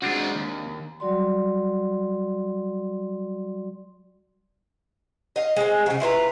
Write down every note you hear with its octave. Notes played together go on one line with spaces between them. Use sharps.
G#3 C4 D4 F4 F#4
D#2
F#3 G3 F#4 D5 C6
D#5 F5
G#3 C4
C#3 F#3
E4 F4 B4 A#5